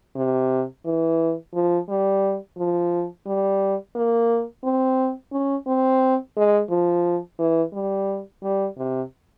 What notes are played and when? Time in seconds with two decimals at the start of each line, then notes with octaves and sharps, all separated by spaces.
0.16 C3
0.85 E3
1.54 F3
1.89 G3
2.58 F3
3.26 G3
3.95 A#3
4.64 C4
5.32 C#4
5.67 C4
6.37 G#3
6.70 F3
7.39 E3
7.73 G3
8.43 G3
8.78 C3